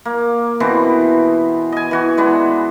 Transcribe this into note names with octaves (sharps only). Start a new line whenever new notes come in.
A#3
B2 E3 B3 C4
D#5 G#5
E3 F#4
G#3 B3 D4